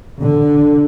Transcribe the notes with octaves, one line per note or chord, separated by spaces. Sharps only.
D3